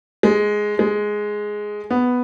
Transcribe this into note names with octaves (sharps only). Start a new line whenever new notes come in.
G#3
G#3
B3